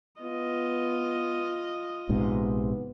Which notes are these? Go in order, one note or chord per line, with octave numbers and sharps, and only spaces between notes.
B3 F4 D#5
A#1 G#2 C3 B3